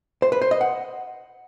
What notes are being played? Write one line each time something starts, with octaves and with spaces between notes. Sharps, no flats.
C5
B4
C5
D#5
F#5